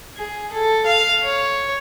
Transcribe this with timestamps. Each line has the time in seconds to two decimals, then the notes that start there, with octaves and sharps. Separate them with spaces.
0.17 G#4
0.53 A4
0.86 F5
1.23 C#5